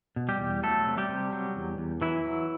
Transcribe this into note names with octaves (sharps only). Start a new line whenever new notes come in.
B2
G3 G4
E2
F#3 A3 A4
C3
G3 G4
C3
F#3
E2
E2
E3 F#3 E4
F#3